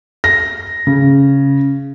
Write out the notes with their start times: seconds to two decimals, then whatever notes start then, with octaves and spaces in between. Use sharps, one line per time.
0.24 A#6
0.87 C#3